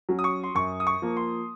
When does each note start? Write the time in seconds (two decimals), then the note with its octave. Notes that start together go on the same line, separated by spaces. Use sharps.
0.09 F#3 C#4
0.19 D#6
0.24 C#6
0.44 C6
0.55 F#2 C#6
0.80 D#6
0.87 C#6
1.02 F3 A#3
1.17 C6